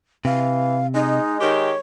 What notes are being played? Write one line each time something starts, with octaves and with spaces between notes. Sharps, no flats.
C3 E3 F5
G#3 D#4
D#3 G4 C#5